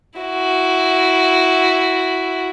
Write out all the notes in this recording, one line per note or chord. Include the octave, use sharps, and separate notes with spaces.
E4 F#4